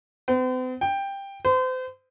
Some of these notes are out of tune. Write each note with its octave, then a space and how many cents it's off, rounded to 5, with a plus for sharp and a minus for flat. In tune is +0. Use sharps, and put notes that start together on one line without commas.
C4 -45
G5 +10
C5 -35